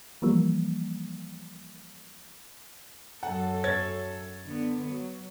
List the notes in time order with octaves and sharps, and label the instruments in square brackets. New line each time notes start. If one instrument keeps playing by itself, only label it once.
[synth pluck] E3 F3 G3 A#3
[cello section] F#2 A4 [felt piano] F#5
[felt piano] C#5 G#6 A6
[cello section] D3 B3
F#3